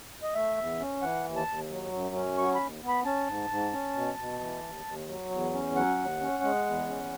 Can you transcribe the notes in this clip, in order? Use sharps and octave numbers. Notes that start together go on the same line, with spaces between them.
D#5
A3 E5
E2
C#4
E3 F#5
D#2
A5
D#2
F#3
F#2
C#4
F#3 C#6
D#2 B5
B3
B5
C#4 A5
G#2
G#2
C#4
B2
B2
E3
D#2
D#2
F#3
E2
C#4
F#3 F#5
D#2
C#4
G#3
E2
C#4